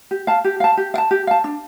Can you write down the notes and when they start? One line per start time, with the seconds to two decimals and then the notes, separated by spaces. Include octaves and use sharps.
0.11 G4
0.27 F5 A5
0.44 G4
0.60 F5 A5
0.77 G4
0.94 F5
0.98 A5
1.11 G4
1.27 F5 A5
1.44 D4